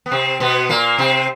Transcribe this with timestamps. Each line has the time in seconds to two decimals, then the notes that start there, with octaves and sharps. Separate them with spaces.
0.06 B3
0.11 C3 C4
0.40 B2 B3
0.69 A#2 A#3
0.98 C3 C4